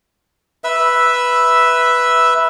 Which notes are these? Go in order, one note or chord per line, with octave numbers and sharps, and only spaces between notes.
B4 E5 E6